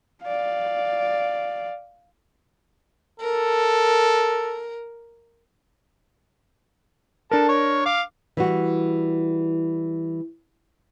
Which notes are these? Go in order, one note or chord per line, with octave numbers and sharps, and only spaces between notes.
D5 F5
A4 A#4
D4 A4 A#4 A5
C#5
F5 D6
E3 G3 F#4